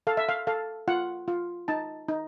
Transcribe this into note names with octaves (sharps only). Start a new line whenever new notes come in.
A4 F5
E5
F5
A4 F5
F4 F#5
F4
D#4 A5
D#4